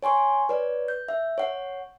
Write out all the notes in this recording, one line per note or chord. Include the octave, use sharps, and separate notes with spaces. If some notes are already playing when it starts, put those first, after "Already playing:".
C#5 G#5 C6 C#6
B4 C#5 D5
G6
E5
C#5 F#5